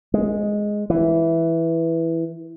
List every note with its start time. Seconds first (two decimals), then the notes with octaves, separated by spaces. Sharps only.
0.14 G#3
0.90 E3